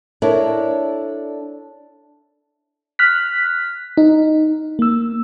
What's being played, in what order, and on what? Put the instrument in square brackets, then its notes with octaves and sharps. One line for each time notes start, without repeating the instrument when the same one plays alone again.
[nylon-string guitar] D4 E4 A4 A#4 C#5 D5
[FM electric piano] F6 F#6 B6
D#4
A#3 E6